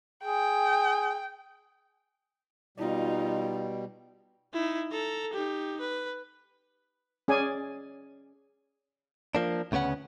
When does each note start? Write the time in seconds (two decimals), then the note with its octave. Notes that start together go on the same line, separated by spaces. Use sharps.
0.24 G#4 G5
2.78 B2 G3 D#4 F4
4.54 D#4 E4
4.92 A4 A#5
5.33 D#4 G4
5.81 B4
7.28 C#4 G#4 D5 G#5
9.35 F3 A#3 D4
9.72 D2 C#3 B3 C#4 F#5